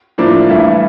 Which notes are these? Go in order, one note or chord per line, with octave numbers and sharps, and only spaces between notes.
A2 F3 A#3 D4
G2 E3 A3